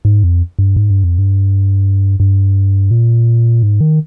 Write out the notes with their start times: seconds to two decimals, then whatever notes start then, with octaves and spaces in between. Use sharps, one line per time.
0.05 G#2
0.24 F2
0.59 G2
0.76 G#2
0.90 G2
1.04 F2
1.18 G2
2.20 G2
2.91 A#2
3.63 G#2
3.81 D#3